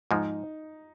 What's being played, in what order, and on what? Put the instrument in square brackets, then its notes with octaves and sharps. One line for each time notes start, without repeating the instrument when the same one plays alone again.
[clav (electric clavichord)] G#2 F3 G#3 [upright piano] D#4